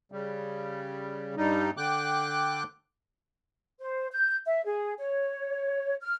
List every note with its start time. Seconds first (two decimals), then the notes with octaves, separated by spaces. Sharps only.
0.12 C#3 G3
1.37 G2 G3 D#4
1.77 D3 G5 D6 F#6
3.80 C5
4.12 G6
4.46 E5
4.65 G#4
4.97 C#5
6.02 F6